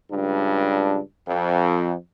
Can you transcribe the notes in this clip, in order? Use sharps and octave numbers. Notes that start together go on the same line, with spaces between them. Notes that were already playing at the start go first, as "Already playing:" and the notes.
C#2 G2 D4
F2